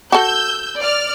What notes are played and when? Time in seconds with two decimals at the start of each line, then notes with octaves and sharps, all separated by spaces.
0.12 F#4 A4 E6 G6
0.80 D5 F6